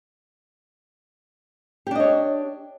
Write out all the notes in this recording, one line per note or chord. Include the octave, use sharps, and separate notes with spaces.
D4 G4 C#5 D#5